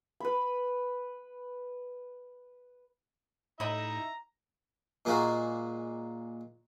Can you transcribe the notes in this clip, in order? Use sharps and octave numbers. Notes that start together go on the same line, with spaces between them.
B4 B5
A2 D#4 E4 D#5 E5 A#5 B5
A#2 G#3 A#3 F#4